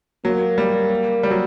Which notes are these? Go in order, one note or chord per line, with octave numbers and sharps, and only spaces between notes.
F#3 A#3
G3
G3
F#3